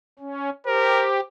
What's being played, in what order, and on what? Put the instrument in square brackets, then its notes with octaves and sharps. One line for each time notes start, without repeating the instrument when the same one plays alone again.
[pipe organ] C#4
[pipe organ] G4 [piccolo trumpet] A#4 [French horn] C5